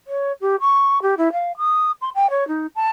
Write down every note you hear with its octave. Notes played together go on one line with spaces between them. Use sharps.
C#5
G4
C#6
G4
E4
F5
D#6
C6
G5
C#5
D#4
A5